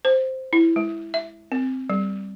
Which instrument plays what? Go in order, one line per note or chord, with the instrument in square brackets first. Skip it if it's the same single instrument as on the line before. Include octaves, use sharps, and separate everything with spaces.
[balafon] C5
E4
G#3
E5
C4
G3